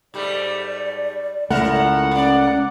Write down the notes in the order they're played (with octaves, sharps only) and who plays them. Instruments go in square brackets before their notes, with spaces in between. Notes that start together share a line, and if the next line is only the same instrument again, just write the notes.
[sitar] G#2 G3 A3 [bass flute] D5
[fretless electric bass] C#2 A3 [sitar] A2 E4 A#4 [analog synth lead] F#5
[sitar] A#3 D5 [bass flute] C#4